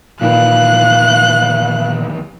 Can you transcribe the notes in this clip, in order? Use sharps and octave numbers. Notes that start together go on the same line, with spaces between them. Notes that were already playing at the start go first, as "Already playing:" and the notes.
D#2 A#2 D#3 E3 B4 F5 F#6